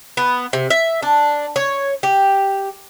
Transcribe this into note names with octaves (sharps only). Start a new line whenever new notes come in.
B3
C3
E5
D4
C#5
G4